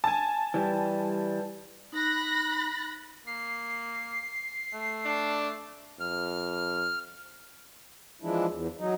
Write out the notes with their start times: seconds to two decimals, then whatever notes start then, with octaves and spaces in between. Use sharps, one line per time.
0.04 G#5 A5
0.54 E3 G3
1.93 D#4 B5 F#6 A#6
3.27 A#3 C7
4.73 A3
5.05 D4
6.00 F2 F6
8.22 E3 F3 G#3 D4 E4
8.49 E2
8.79 F#3 D#4